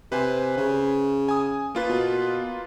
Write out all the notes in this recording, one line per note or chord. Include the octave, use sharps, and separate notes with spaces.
C3 B4 C5 G#5
C#3
G#5 D#6
A#3 F4 B4
B2